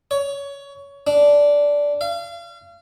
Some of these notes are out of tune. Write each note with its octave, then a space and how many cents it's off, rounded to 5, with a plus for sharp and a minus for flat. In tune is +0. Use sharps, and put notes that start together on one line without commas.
C#5 +20
D4 -10
F5 -35